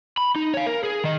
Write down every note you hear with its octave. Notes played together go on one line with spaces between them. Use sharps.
B5
D#4
C#5 F5
A#4
G#4
D#3 D#5